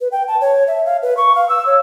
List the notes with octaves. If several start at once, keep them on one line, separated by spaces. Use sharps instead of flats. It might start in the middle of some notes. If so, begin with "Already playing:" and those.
B4
G5
A5
C#5
E5
F5
B4
C#6
F5
E6
C#5